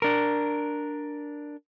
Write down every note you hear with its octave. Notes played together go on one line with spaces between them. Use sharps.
D4 A#4